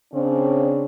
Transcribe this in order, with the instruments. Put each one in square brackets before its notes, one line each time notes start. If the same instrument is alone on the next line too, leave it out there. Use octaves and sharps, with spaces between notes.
[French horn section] C#3 C4 D4